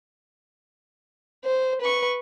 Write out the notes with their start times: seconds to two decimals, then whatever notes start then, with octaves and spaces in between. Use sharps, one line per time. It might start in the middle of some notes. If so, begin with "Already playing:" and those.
1.45 C5
1.82 B4 C#6